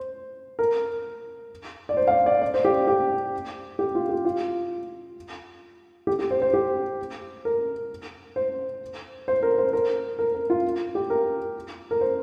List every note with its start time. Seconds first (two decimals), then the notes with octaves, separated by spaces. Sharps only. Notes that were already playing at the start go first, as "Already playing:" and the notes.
Already playing: C5
0.59 A#4
1.89 D5
1.97 C5
2.08 F5
2.11 D5
2.26 D5
2.42 D5
2.54 C5
2.65 G4
2.87 G4
3.79 G4
3.95 F4
4.09 G4
4.25 F4
6.07 G4
6.19 G4
6.31 C5
6.42 C5
6.54 G4
7.45 A#4
8.36 C5
9.28 C5
9.43 A#4
9.58 C5
9.73 A#4
10.19 A#4
10.34 A#4
10.50 F4
10.95 G4
11.10 A#4
11.91 A#4
12.01 C5